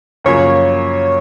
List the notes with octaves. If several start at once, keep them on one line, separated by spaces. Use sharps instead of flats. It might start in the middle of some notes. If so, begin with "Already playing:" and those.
F#2 C#3 F3 A#3 C#5